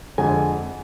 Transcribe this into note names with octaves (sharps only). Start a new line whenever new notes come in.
F2 D3 G#3 G#5